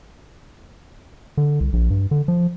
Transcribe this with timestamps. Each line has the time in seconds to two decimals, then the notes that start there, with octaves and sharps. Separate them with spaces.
1.37 D3
1.60 C2
1.73 A#1
1.90 G2
2.11 D3
2.28 F3